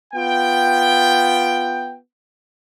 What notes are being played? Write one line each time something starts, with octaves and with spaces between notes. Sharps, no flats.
B3 F4 G5